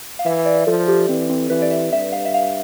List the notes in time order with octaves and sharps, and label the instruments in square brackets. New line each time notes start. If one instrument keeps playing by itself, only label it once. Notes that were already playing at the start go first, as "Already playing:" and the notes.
[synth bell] F5
[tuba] E3 [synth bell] E5
[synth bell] D5
[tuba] F3 [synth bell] A4
[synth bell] G4
[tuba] E3 [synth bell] C4
[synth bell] C4
[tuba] E3 [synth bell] B4
[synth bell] D5
E5
[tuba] G2 [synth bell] E5
[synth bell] F5
E5
F5